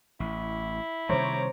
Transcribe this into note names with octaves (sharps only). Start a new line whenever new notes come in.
A1 E4
C3 D#3 G3 C5 C#5 A#5 D6